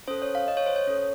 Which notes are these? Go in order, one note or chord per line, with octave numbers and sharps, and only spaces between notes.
C#4 A4 C5
C#5
F5
D#5
C#5
C5
C#5
C#4 A4